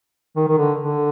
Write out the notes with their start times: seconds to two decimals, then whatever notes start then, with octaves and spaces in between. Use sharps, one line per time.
0.36 D#3
0.47 D#3
0.58 D3
0.78 D3